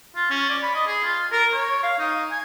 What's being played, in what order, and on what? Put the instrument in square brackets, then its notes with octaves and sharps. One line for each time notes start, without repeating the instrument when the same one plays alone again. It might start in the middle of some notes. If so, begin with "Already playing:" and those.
[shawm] F4
C#4
D5
B5
D#5
G#4
F4
A#4
C#5
F5
D#4
G#5